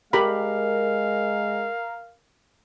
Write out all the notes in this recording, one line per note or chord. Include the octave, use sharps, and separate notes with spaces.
G#3 G4 A#4 F5 B5